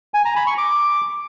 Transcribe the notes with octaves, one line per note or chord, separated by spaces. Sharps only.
G#5
A#5
B5
C#6
D6